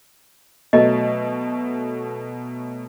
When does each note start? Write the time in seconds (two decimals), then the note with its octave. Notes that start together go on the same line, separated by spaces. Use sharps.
0.73 B2 F#3 A3 D#5